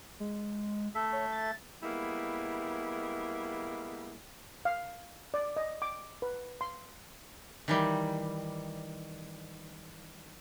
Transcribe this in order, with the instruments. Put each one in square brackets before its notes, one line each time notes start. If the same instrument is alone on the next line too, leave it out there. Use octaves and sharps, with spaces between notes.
[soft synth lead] G#3
[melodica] A3 A4 E5
[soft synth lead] C#5
A6
[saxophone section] G3 G#3 A#3 B3 E4
[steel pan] F5
D5
D#5
D6
B4
C6
[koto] D#3 E3 G3